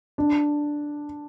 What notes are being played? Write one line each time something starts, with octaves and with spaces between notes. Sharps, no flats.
D4